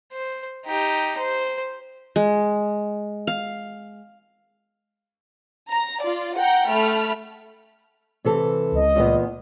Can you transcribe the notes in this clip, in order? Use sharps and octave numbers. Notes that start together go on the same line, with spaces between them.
C5
D#4 G4
C5
G#3
F5
A#5
F4 D5
F#5 G5 A#5 G6
A3 B5 F6
C3 E3 A4
C#2 D#5
E2 A#2 B3